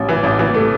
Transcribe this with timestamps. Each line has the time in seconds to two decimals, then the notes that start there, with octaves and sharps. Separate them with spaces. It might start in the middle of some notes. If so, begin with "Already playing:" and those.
Already playing: A1
0.08 E3
0.23 A1
0.39 E3
0.54 A3